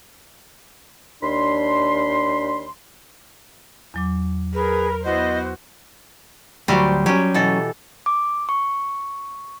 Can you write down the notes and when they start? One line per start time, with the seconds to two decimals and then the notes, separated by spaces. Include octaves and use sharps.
1.23 D#2 D4 B5 C6
3.94 E2 F#3 D6
4.54 G#4 A#4 B4
5.05 B3 E4 F#4 C5 D#5
6.68 D2 F#3 G3 C4 G4
7.06 F#3 C#4 G4
7.34 B2 E3 A4
8.06 D6
8.49 C#6